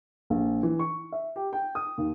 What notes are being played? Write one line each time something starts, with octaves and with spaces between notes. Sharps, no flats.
A#1
E3
C#6
E5
G4
G5
D#6
D#2